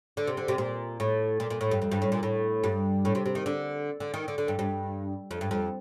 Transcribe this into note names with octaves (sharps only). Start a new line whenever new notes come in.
D3
C3
D3
C3
A#2
A2
A#2
A#2
A2
G2
F2
G2
A2
A#2
A2
G2
A2
C3
C3
D#3
D3
D3
D#3
D3
D3
G2
G2
F2
G2
F2